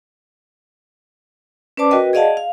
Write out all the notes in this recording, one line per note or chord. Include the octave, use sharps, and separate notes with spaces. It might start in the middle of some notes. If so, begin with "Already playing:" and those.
C#4 B4 C5 D5 A5 D6
F#4 A#4 B4 D#5 G5
G#4 D5 D#5 F5 F#5 A5
F5